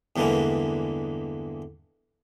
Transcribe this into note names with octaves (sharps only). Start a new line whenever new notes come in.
E2 G2 D3 E3 G#3 A#3